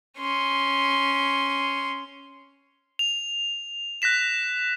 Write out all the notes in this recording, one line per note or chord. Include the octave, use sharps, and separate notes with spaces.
C#4 C6
F7
F#6 A#6 B6 E7